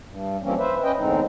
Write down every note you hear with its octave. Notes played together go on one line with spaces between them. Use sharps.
G2
E3 F3 G3 A#3 C4 C#4
B4 C5 E5
C#4 B4 D#5 G5
E2 A2 D3 G#3 C4 D#4